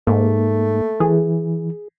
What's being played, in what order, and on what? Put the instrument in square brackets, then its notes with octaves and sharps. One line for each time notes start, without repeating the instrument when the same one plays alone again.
[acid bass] G#2 [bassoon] A3 [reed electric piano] A#3
[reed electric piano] E3 [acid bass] G#4